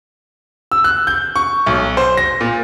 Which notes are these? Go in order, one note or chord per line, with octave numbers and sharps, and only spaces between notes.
E6
F#6
G6
C#6
B1
C5
A#6
A#2